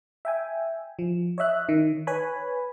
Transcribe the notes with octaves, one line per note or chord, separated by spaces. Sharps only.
E5 G5 G#5
F3
C#5 D#5 E5 F#6
D#3
B4 C#5 G#5 B5